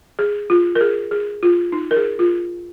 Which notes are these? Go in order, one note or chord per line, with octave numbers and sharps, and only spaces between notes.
G#4
F4
A#4
G#4
G#4
F4
D#4
A#4
G#4
F4